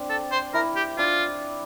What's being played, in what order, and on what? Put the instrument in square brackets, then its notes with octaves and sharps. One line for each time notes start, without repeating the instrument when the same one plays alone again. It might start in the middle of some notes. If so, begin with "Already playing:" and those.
Already playing: [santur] C4 D4
[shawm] A4
C5
[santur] E4 [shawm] A#4
[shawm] G4
[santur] D4 [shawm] F4